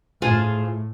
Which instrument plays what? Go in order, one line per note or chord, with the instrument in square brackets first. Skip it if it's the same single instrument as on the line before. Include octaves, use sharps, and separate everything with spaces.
[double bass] A2 [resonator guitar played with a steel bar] F4 G#4 C5